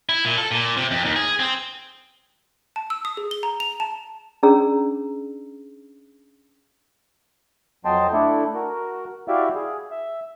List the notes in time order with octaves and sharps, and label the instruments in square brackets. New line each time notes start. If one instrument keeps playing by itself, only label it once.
[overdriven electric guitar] E4
A#2
A4
A#2
C3
F2
D#2
G#4
C4
[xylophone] A5
E6
D#6
G#4
G7
A#5
F7
A5
[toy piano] C#4 D4 G#4 D5 A#5 E6
[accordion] F2 F#3 D#5 G5 A5 C6
A3 D4 E4 A4
F#4 A#4
E4 F#4 G4 D5 E5 F5
G#4
E5